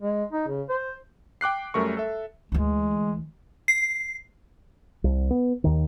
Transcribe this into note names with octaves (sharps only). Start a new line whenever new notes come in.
G#3
D#4
C#3
C5
G5 D6 F#6 C7
F#2 G3 A3 A#4 C#6
A4 E5
D2 E3 G#3
C7
C2
B3
D#2 D#3